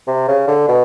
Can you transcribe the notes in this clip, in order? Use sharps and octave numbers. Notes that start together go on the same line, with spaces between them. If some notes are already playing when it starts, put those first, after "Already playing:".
C3
C#3
D3
B2